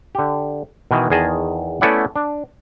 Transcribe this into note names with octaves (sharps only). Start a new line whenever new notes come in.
D3 G4
B2 D#3 E3
E2 D#3 G#4 D#5 A5
A3 B3 C#4 E4 D5 F#5
D4